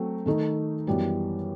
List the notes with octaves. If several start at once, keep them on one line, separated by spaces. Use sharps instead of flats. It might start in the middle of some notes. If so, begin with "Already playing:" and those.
Already playing: F#3 A3 C4
D#3 A3 D#4
F#2 E3 G3 B3